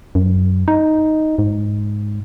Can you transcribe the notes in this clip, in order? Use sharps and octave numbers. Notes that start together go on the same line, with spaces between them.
F#2
D#4
G#2